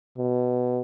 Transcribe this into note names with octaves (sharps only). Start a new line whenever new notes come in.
B2